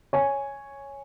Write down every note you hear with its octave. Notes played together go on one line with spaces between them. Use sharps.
C#5 G#5